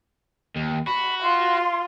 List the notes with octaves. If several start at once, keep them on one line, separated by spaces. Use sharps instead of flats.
D#2
F#4 B5
F4 C6